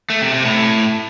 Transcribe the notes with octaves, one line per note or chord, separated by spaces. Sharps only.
A3
C3
C3
A2